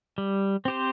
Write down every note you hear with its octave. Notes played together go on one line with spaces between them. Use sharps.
G3
C4 G4 C5